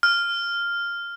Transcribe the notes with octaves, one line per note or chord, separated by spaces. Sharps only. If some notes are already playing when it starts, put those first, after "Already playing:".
F6